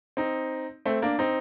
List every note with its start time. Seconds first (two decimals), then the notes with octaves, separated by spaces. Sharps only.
0.17 C4 D#4
0.85 A3 C4
1.02 A#3 D4
1.19 C4 D#4